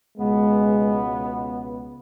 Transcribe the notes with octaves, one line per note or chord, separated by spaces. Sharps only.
C#2 B2 G#3 B3